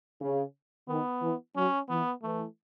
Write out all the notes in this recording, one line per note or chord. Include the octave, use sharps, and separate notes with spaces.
C#3
D#3 B3
E3
F#3 C#4
E3 B3
E3 A3